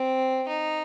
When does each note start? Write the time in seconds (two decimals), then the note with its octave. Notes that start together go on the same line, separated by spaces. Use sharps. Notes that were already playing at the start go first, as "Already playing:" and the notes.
Already playing: C4
0.48 D#4